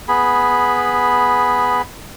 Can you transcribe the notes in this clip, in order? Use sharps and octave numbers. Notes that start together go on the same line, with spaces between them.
B3 G#4 B5